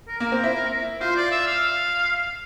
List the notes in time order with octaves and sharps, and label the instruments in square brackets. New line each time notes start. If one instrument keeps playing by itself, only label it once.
[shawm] A#4
[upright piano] A#3
C4
E4
[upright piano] F4 [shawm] C5
[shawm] D5
E5
F5